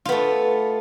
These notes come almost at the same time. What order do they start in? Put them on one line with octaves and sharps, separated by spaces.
F4 B3 A3